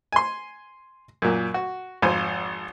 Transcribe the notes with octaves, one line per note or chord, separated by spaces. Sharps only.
G#5 C6
F#2 A#2
F#4
G#1 F2 C5 G#5